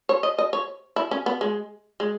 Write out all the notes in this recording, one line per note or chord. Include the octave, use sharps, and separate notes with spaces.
C#5
D#5
D#5
C#5
E4
C#4
B3
G#3
G#3